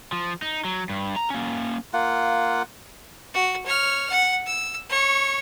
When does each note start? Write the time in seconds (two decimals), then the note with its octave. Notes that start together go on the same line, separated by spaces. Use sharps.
0.13 F3
0.42 D#4
0.65 F#3
0.90 G2
1.16 A#5
1.30 A#3 C#4
1.93 A#3 F4 F#5
3.34 F#4
3.66 C#5 F6
4.10 F#5
4.46 E6
4.90 C#5 C#6